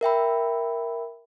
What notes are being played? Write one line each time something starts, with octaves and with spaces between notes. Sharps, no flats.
A#4 E5 G5 B5